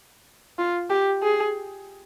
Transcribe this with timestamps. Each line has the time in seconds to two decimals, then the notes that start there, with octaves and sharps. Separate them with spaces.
0.59 F4
0.90 G4
1.23 G#4